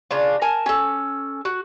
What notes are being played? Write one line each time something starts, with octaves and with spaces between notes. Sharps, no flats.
C#3 D4 F4
A#4 G#5 A5
C#4 A4
F#4